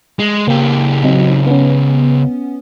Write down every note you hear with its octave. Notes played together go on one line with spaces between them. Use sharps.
G#3
C#2 A#3 G4
F#3 C4 D#4
B3 C#4